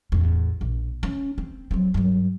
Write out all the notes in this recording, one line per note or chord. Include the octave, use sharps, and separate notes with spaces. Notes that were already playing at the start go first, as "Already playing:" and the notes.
A1 E2
A#1
C#4
C4
F#3 C4
G2 F#3